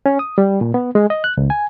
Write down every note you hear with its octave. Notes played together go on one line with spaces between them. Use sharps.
C#4
D#6
G3
A#2
B3
G#3
D#5
F#6
C#2
G#5